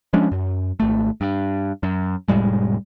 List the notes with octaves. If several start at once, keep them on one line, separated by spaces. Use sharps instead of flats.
F3 G#3 C#4 D4
F#2
G#1 A3
G2
F#2
F1 A2 G3 G#3